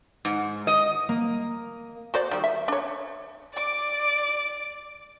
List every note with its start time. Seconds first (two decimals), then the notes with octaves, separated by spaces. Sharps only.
0.25 G#2
0.67 D#5
1.09 A#3
2.14 F#4 C5 D5
2.31 D#3 G3
2.44 E5
2.68 D4 C#5
3.53 D5 D6